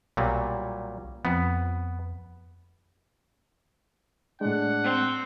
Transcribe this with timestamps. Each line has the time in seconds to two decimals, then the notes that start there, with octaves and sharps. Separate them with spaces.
0.17 B1 A#2 F#3 G3
1.25 F2 B3
4.41 A2 G#3 D4 F#5
4.84 C4